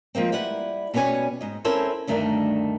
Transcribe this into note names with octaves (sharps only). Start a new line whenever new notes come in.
F3 G#3 A#3 C4
G3 E4 B4 F#5
B2 G3 B3 C#4 G#5
G#2 D#5
C4 C#4 E4 A4 A#4 C5
D2 G2 D#3 A3 D4 A#4